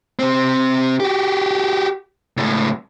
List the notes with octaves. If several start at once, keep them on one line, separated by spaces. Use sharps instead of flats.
C3 C4
F#4 G4
C#2 A2